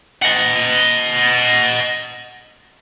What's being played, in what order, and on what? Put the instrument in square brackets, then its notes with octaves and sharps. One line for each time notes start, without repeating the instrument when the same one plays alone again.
[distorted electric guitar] D#5 F#5